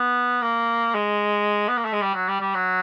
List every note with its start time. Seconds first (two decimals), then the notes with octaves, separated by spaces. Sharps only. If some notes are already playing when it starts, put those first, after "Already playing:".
Already playing: B3
0.42 A#3
0.95 G#3
1.69 B3
1.77 A#3
1.85 A3
1.93 G#3
2.02 G3
2.14 F#3
2.28 G3
2.41 G3
2.55 F#3